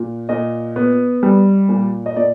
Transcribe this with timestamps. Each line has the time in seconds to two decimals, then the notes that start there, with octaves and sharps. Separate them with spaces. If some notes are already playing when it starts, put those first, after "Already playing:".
Already playing: A#2
0.29 A#2 D#5
0.76 B3
1.23 G3
1.69 A#2
2.06 D#5
2.16 A#2 D5